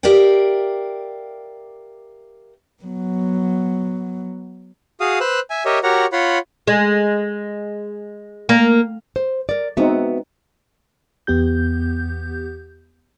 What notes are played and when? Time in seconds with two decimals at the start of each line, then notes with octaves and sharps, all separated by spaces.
0.03 G4 A#4 D5 E5 F5 G5
2.83 F#3 B3
5.01 F#4 G#4 F5 D#6
5.20 B4 C5 E6 F#6
5.50 E5 G#5
5.65 G4 A#4 C#5 D#5 E5
5.83 F#4 G4 A#4 C#5 F#5 A#5
6.12 F4 C#5 F#5 B5 C6
6.67 G#3
8.49 A#3
9.16 C5
9.49 A#4 D5
9.77 G#3 B3 C4 D#4 F#4 E5
11.27 E2 B3 G4 G6